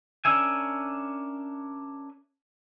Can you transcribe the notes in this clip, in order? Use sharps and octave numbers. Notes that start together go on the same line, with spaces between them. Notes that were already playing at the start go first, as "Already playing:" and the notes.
C#4 D4 A#4 E5 G#5